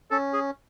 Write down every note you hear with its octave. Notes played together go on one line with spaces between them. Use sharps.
C#4 A4
G#4